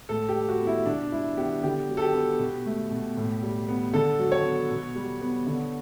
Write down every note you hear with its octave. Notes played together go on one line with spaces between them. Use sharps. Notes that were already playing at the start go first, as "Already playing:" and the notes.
A2 A4
G4
G3
F#4
B3
E4
B2 D4
G3 E4
B3 G4
D3 G4
F#3
A4
G4
B3
B2
A3
B2
A2
G3
B3
D3 A4
F#3
C#5
B3
B2
G3
B3
D3